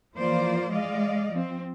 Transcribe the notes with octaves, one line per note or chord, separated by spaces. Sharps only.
E3 F3 A#3 F4 C5 D5
G#3 D5 D#5 F5
F3 C4